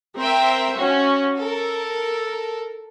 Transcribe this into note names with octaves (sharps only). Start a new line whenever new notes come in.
C4 A#4 C5 E5 G5
C#4 F#4
A4 A#4